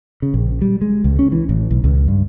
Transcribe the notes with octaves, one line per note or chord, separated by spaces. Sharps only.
C#3
A#1
G3
G#3
C#2
C#4
E3
A1
B1
C#2
G2